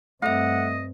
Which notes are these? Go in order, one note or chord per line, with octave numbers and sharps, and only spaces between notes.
G2 A3 C4 A4 D#5 E5 F#5